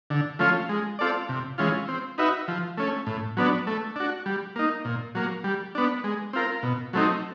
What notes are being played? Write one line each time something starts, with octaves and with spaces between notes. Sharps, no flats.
D3
F3 A3 C#4 F4
G#3
C4 F4 A4 D5
C3
E3 G#3 C#4 F4
C4
D#4 F#4 B4 E5
F3
A3 C#4
A2
F#3 B3 D4
A3
D4 F#4
G3
A#3 D#4
A#2
F#3 A#3
G3
B3 D4
G#3
C4 F4 A#4
B2
F#3 A3 C4 D#4